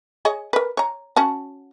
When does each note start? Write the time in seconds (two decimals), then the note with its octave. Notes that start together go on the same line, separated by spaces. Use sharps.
0.25 G#4 C#5 D#5
0.53 A#4 B4
0.77 C#5 A#5
1.16 C#4 F#4 A5